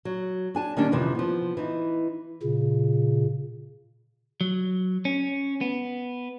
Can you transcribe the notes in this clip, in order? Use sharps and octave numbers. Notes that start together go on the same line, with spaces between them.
F#3
D4 G#5 A5
D#3 G3 A#3 C#4 D4
F2 C3 D#3 E3
F3 B3
E3 D#4
A#2 C#3
F#3
C#4
B3